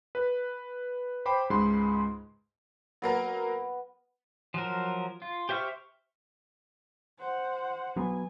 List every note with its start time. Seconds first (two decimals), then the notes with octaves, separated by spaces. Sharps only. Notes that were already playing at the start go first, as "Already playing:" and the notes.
0.15 B4
1.26 C5 G5 B5 D6
1.50 C#2 G#2 G#3 B5 C6
3.02 F#3 A#3 B3 A#4
4.54 F3 F#3 A#4
5.22 F4
5.49 G4 C5 E5 C#6 F6
7.19 C5 F#5
7.96 F#3 B3 G#5